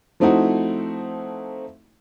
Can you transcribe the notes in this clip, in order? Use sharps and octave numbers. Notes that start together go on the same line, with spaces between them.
F3 A3 C4 D#4 E4 F#4